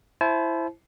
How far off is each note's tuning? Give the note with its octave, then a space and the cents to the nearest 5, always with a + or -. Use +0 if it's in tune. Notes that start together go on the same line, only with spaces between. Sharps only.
E4 +15 C5 +5 A5 -40